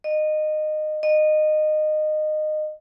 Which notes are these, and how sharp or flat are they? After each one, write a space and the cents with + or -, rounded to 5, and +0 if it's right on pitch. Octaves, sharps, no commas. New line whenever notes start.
D#5 -20
D#5 -20